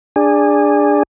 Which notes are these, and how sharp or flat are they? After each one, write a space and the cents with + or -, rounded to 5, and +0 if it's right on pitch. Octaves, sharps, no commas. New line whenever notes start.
D4 +0 G#4 -20